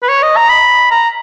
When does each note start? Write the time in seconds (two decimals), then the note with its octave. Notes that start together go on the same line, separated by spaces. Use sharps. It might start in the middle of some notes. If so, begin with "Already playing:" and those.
0.03 B4
0.09 C#5
0.22 D#5
0.36 A#5
0.49 B5
0.91 A#5